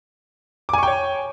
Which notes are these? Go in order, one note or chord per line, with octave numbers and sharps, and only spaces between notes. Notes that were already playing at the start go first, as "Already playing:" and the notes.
C#5 G5 G#5 C#6 D6